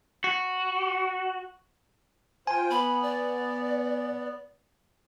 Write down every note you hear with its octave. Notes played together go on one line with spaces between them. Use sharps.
F#4
F4 C5 G5 G#5
B3 B5
D5